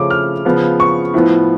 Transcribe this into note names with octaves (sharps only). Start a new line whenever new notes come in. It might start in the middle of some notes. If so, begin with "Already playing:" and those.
Already playing: C#3 F3 A3 C#4 D6
F6
C#3 F3 B3
C#6
A2 F3 B3